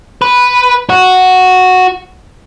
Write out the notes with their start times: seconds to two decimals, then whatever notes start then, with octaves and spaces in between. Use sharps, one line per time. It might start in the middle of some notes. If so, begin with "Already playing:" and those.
0.22 B4
0.89 F#4